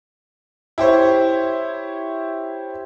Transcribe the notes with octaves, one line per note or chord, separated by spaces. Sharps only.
E4 G4 C5 C#5